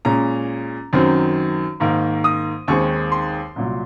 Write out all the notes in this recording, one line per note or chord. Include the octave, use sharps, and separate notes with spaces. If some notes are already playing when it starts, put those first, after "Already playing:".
A#2 G#3 C#4 A#5
F#2 D#3 F#3 C4
G#2 D#3 A#3
D#6
D#2 D#3 G#3 C4 C#6
C6
C2 A#2 F#3